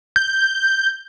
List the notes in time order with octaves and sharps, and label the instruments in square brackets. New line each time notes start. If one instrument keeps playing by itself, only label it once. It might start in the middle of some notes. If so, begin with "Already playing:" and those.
[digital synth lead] G6